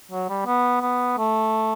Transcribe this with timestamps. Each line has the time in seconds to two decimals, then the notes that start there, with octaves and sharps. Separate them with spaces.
0.11 F#3
0.29 G3
0.46 B3
0.81 B3
1.18 A3